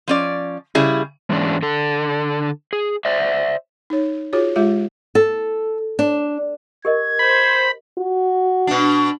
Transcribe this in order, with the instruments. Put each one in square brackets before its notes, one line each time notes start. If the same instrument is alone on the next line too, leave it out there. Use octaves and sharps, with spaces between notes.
[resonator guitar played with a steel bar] F3 C#4 D5
C#3 G3 E4 G#4
[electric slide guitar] G#2 E3 G#3 C#4 D4
D3 A4
G#4
C5 D5 E5
[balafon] D#4 C#5
F4 F#4 G#4 C#5
G#3 F4 G4 E5
[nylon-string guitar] A4
D4
[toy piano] G4 A#4 D#5 [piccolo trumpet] G#6
[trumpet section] C5 [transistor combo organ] B5
[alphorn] F#4
[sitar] B2 D4